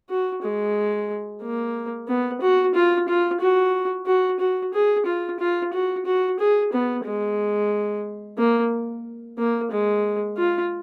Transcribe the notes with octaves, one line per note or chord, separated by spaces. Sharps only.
F#4
G#3
A#3
B3
F#4
F4
F4
F#4
F#4
F#4
G#4
F4
F4
F#4
F#4
G#4
B3
G#3
A#3
A#3
G#3
F4